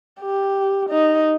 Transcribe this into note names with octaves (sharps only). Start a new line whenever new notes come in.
G4
D#4